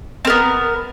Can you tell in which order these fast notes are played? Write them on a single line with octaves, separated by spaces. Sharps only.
C4 A#4 B3